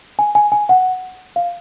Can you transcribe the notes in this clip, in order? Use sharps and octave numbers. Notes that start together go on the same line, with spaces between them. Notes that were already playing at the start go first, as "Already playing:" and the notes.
G#5
G#5
G#5
F#5
F5